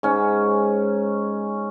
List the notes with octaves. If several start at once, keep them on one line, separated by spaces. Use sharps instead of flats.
G#2 C#4